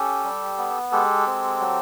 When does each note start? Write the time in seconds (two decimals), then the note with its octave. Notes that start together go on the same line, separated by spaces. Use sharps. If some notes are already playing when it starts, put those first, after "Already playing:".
Already playing: C#4 G4 A4
0.24 G3
0.58 B3
0.92 G#3 G4 A4
1.26 C4
1.60 F#3